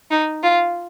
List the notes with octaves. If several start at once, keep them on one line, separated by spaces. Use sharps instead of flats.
D#4
F4